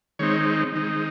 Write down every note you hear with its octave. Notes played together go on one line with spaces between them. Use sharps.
D#3 G#3 C4 D#4 C#5
D#3 G#3 C4 D#4